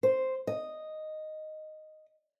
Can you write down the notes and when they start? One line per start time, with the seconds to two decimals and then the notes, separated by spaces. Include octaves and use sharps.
0.03 C5
0.47 D#5